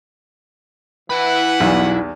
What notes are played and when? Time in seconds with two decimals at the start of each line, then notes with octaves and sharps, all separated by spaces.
1.10 E3 E4 B4 F#5 B5
1.60 B1 E2 G3